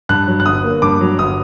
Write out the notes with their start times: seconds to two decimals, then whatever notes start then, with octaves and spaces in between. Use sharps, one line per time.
0.09 G2 F#6
0.28 F#3
0.40 F#6
0.46 G1 D#6
0.64 A#3
0.82 G2 D6
1.01 F#3
1.18 G1 D#6